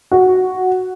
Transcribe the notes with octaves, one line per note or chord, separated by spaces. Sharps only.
F#4